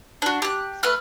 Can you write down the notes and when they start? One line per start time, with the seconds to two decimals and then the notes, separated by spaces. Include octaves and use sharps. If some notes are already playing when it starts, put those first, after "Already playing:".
0.22 D4 F#4
0.42 G4 F#6
0.83 A3 B4 F6 F#6